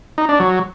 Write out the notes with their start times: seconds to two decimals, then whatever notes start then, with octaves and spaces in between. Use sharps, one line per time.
0.18 D#4
0.29 D4
0.40 F#3